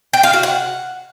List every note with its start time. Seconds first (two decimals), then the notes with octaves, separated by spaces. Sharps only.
0.13 G5
0.23 F5
0.33 F#4
0.43 F#5